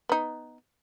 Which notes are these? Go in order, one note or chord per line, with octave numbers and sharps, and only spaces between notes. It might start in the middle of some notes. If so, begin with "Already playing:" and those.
B3 D#4